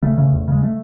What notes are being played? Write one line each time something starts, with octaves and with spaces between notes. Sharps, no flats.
C#3 A3
C#3
E2
C#3 G#3
A3